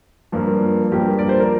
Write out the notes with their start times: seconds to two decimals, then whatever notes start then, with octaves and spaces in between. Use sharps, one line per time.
0.32 G2 F3 A#3
0.91 G2 F3 A#3 G4
1.19 D5
1.29 C5
1.40 A#4